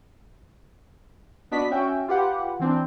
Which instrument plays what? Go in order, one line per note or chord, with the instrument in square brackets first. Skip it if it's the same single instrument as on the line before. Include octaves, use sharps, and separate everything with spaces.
[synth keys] B3 D4 F#4 D#5 B6
C#4 F#4 E5 G5
F4 G4 B4 F#5
E3 C4 D4